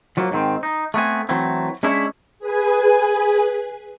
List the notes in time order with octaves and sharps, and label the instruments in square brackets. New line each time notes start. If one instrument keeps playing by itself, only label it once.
[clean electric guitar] F3 F#3 A#3
G#2 D#3 C4
D#4
A3 B3 C4 G#5
E3 F#3 A3 C4 E4
G#3 C#4 D4 E4 C#5 E5
[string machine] G#4 B4 G#5